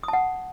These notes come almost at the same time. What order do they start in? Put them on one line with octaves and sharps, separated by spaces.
D#6 A5 F#5